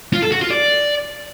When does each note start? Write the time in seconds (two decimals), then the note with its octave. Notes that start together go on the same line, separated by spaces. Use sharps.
0.13 F4
0.22 A4
0.32 F#4
0.41 F4
0.51 D5